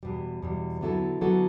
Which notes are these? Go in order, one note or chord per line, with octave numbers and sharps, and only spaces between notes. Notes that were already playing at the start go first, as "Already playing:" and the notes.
E2 B2 G3
E2 B2 G3
D3 F#3 B3 E4 A4
D3 F#3 B3 E4 A4